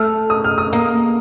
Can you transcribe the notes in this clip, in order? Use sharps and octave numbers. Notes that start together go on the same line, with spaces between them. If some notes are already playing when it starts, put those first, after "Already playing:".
Already playing: A3 F6
D#6
F6
D#6
A#3